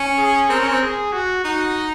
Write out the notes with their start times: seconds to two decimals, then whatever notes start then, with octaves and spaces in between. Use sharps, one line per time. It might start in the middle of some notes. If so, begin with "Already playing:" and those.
Already playing: C#4
0.18 G#4
0.49 C4 A#4
0.59 C#4
0.69 C4
0.82 G#4
1.13 F#4
1.44 D#4 F#4